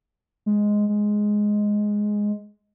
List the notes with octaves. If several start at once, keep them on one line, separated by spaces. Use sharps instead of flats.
G#3
G#3